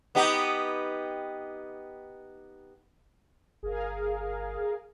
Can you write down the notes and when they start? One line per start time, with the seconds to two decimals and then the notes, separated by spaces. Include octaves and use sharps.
0.15 B3 D#4 G4
3.63 G1 G#4 A#4 F5